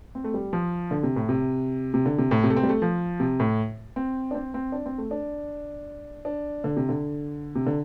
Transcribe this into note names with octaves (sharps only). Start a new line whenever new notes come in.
C4
A3
G3
F3
D3
C3
A2
C3
C3
D3
C3
A2
C3
A3
C4
G3
A3
F3
C3
A2
C4
D4
C4
C4
D4
C4
A3
D4
D4
D3
C3
D3
C3
D3